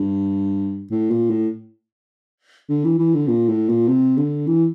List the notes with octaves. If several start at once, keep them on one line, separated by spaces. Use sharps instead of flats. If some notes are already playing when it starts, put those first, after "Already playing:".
Already playing: G2
A2
A#2
A2
D3
E3
E3
D3
A#2
A2
A#2
C3
D3
E3